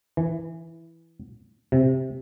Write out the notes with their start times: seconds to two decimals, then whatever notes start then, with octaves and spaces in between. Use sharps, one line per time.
0.17 E3
1.72 C3